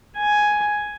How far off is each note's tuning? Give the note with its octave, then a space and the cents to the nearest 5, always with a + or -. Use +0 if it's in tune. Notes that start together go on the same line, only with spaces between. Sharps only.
G#5 +5